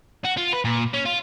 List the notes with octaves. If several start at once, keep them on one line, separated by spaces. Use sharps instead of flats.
F#4
F4
B4
A#2
C#4
F4